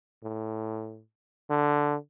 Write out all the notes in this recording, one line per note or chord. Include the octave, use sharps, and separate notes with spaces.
A2
D3